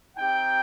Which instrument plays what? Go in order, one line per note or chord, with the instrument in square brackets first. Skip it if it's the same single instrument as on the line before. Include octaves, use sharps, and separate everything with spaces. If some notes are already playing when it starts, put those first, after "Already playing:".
[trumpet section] C4 D#4 G4 G5